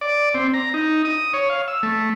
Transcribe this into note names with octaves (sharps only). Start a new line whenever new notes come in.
D5
C4
A#5
D#4
D#6
C#5
F5
E6
A3